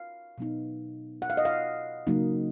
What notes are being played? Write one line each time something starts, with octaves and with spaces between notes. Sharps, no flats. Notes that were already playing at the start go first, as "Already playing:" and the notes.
Already playing: F5
B2 F#3 B3 D#4
F#5
F5
D#5
F5
C#3 F#3 A#3 D#4